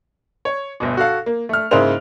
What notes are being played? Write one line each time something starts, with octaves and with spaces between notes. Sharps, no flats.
C#5
G1 D2 B2
F#4 A4 F5
A#3
A3 F6
G#2 C#3 A#3 E4 C5 F7